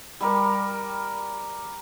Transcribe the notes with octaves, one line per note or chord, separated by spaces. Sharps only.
G3 G4 A#4